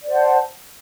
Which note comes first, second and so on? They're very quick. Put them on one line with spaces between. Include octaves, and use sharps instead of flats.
D5 C5 F#5 A5